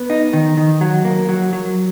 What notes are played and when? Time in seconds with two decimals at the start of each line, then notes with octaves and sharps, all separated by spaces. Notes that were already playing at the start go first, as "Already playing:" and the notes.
Already playing: B3
0.10 D#4
0.33 D#3
0.57 D#3
0.81 F#3
1.05 A#3
1.29 F#3
1.53 F#3